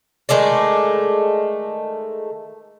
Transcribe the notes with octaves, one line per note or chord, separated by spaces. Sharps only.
D#3 G#3 A3 D5